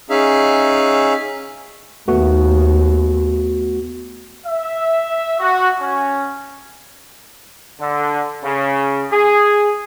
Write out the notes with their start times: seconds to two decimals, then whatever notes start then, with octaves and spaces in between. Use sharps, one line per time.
0.10 C#4 D#4 G#4 E5 F5
2.08 D#2 A3 B3 F#4
4.46 E5
5.39 F#4
5.81 C#4
7.80 D3
8.44 C#3
9.12 G#4